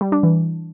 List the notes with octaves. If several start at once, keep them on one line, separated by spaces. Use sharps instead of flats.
G3
D4
E3